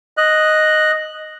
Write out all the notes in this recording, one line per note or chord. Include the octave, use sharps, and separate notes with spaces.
D#5 F#6